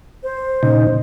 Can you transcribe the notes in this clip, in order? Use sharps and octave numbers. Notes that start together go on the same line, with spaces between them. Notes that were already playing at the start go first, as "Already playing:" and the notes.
C5
A#2 C#3 D#4